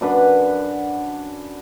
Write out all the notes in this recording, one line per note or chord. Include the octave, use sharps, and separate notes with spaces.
F#2 D4 B4 F#5